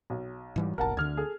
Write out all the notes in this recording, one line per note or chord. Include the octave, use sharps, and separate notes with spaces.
B1
G#2 E3 G3
F#1 B1 A#4 F#5 A5
D2 D3 F6 G#6
G#4 A4